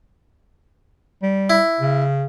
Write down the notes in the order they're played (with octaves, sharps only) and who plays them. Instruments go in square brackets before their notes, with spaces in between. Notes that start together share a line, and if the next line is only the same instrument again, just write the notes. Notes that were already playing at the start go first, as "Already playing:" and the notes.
[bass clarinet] G3
[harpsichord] E4
[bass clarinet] C#3